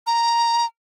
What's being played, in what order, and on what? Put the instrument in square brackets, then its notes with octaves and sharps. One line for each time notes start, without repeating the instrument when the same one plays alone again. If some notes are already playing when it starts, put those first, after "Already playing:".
[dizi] A#5